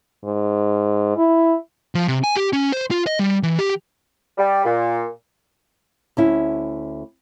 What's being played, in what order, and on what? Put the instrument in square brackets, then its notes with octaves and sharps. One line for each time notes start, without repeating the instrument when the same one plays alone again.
[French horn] G#2
E4
[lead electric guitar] F3
C3
G#5
G4
C#4
C5
F4
D#5
G3
E3
G4
[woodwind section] G3
A#2
[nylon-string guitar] D2 C#4 E4